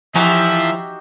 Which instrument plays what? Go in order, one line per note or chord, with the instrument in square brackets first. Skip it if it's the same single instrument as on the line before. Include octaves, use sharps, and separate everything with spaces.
[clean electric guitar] E3 G#5 A#5 [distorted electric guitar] F3 [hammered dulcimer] D#4 F#4 G4 [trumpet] E5